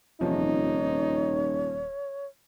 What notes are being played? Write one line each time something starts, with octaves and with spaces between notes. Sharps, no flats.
D#1 E2 C3 F3 D#4 C#5